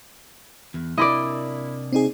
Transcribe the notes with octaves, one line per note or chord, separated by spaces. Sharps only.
E2
C3 A#3 D4 E4 D5 D#5 B5
C4 D#4 G#4